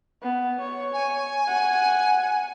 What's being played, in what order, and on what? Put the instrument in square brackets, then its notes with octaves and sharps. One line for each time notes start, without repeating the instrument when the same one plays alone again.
[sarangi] B3
C#5
[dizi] G#5
[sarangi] F#5